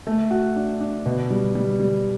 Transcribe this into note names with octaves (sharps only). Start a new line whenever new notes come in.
A3
F#4
D4
D4
B2
G3
G3
G3